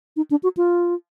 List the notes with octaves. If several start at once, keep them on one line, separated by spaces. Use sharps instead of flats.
D#4
D4
F#4
F4